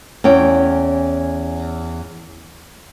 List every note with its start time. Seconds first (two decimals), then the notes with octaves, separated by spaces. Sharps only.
0.24 E2 C#4 G5